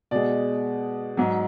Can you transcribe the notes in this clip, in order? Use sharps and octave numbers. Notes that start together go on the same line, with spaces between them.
B2 G#3 D5
G#2 F#3